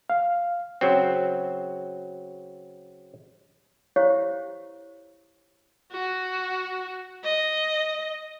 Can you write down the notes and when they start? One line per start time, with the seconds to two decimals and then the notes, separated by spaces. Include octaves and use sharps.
0.10 F5
0.81 C#3 F#3 C4
3.96 E4 G4 C5 C#5 F5
5.92 F#4
7.24 D#5